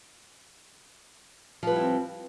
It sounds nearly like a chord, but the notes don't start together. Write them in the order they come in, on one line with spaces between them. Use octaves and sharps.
F3 B4 G3 E4 C4